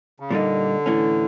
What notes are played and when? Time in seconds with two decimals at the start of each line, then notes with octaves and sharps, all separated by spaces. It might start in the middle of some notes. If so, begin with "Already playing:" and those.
0.20 C#3
0.31 A#2 D3 G3 A#3 D#4
0.86 A2 E3 A3 C#4